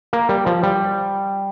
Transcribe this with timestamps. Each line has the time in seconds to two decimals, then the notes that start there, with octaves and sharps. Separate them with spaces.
0.13 A#3
0.29 G3
0.46 F3
0.63 G3